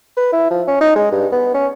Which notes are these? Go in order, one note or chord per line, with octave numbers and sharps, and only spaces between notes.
B4
E4
F3
C#4
D#4
G#3
G2
B3
C#4